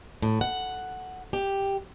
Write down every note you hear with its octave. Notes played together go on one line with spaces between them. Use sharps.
A2
F#5
G4